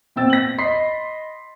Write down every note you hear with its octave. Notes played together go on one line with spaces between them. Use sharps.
A#2 B3 C4 G5 E6 A6
A#6 F#7
D#5 B5 C6 B6 C7